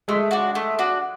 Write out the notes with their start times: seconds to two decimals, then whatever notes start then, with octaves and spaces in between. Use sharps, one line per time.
0.08 G#3 A3
0.31 D4 F#4
0.55 A3
0.79 D4 F#4